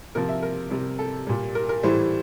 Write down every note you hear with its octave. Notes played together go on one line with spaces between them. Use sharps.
C3 F3 A#4
E5
A#4
C3 G3
A4
A#2 G3
A#4
A#4
A2 E3 G3 C5